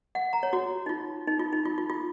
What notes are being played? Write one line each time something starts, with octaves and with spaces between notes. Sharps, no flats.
F#5
A#5
C#5
F#4
D#4
F4
D#4
F4
D#4
F4
F4
F4